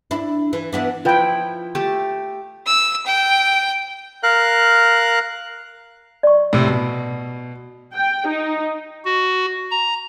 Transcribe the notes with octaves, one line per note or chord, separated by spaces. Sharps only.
D4 E4
E3
E3 B3 D4
F3 E4 F4 B4 G5
A3 G4 A5
E6
G5
A#4 F5 F#6
D5 C#6
A2 C3
B2
G5
D#4
F#4
A#5